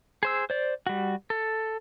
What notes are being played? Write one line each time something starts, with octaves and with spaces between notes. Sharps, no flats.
G#4 C5 E6
C5 D5
G3 F#4
A4